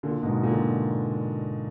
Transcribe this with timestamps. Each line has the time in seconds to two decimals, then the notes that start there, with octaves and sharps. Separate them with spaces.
0.03 A#2 D3
0.23 G#2 B2
0.43 A#2 D3